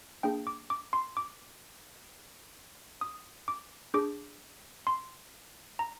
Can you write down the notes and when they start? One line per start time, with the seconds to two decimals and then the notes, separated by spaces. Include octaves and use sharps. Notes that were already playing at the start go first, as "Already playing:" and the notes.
0.23 A#3 D4 G#4 G5
0.47 D6
0.70 D6
0.93 C6
1.17 D6
3.01 D#6
3.48 D6
3.94 D4 G#4 D6
4.87 C6
5.79 A#5